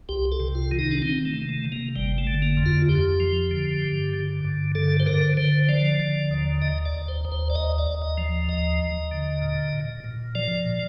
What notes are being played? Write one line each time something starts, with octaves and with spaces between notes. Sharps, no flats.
C2 G4
A4
C3
F4
D#3
D#4
D4
D#3 C4
A3
C3
A3
C3
A#3
G1 G3
A3
D3
A#3
F2
F4
F2 G4
F3
D3
G2
D3
G2
D3 A4
C5
D3 A#4
D3 C5
F3 D5
D3
D#2
D#2 D#5
D5
D#2
C5
D#2
C5
D5
D#2 D#5
D5
D#2
D#5
F3
D#2 D#5
D#2
D3
A#2
A#2
A#2
F3 D5
A#2